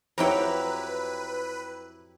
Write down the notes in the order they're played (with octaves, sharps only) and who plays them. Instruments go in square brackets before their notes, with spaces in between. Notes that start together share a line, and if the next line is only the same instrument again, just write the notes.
[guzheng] F2 F#3 G5 [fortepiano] E4 G4 A#5 [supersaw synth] B4